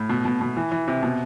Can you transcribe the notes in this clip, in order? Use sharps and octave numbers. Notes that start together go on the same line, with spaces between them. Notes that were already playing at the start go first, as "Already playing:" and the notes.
Already playing: A2
B2
B2
B2
E3
E3
C3
B2